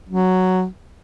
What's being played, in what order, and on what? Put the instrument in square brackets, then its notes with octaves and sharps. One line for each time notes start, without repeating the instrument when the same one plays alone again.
[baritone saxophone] F#3